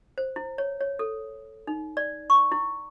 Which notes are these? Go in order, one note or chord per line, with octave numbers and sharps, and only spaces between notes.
C5
E4
C#5
C#5
A4
D#4
D5
C#6
E4